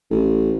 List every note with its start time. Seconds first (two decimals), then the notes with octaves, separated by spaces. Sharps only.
0.11 A1